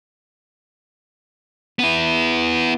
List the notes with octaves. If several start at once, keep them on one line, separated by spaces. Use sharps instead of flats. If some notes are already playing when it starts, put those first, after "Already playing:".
B3 E4